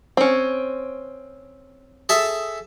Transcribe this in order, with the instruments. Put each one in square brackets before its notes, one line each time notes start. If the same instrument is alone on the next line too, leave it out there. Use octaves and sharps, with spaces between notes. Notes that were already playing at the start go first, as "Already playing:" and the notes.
[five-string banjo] C4 C#4
[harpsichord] G#4 A4 E5